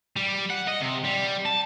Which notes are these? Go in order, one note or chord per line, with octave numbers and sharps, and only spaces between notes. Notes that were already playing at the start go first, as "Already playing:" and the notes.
G3
F#5
D#5
C3
G3
A5